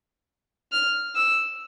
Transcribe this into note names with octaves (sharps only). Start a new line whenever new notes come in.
F6
E6